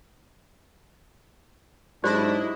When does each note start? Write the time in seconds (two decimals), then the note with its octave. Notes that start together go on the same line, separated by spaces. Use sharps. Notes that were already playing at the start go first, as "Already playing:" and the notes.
2.04 G#2 F#3 D4 E4 G4 C5 D5 D#5